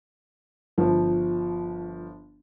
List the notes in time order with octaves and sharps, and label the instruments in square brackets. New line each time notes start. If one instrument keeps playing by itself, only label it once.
[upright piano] G1 F3